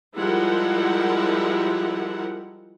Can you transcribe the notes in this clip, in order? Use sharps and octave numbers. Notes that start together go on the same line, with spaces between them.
F3 G3 G#3 E4 A#4 F#5